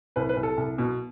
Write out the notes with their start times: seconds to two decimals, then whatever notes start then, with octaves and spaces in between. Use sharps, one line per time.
0.16 C2 B4
0.29 B4
0.37 C2
0.43 A4
0.57 C2
0.78 B2